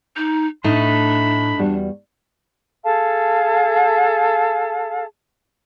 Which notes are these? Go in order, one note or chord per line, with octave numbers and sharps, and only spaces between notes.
D#4
A2 A3 D4 D#4 B5
E2 G3 F#4
G#4 A4 F5 A5